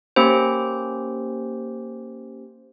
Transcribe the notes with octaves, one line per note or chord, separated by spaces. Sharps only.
A#3 C#4 G4 C5